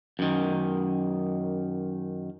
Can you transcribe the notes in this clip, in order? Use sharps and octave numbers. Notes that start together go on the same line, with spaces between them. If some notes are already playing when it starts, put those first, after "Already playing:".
F#2 D#3